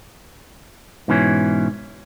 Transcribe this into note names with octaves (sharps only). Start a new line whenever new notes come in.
G#2 B2 E3 C#4